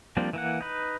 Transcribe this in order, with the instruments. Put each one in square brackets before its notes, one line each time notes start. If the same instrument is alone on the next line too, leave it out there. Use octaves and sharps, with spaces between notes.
[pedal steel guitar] F3 G3 A#3 C4 D4
E3 A#3 F#5
D#4 B4